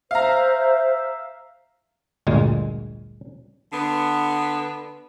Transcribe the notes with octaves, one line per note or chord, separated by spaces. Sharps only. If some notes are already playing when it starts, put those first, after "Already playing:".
C5 E5 F5 A#5
G1 D2 A#2 G#3 G#5
D3 B3